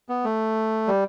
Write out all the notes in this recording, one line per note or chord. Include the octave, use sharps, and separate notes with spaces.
B3
A3
G3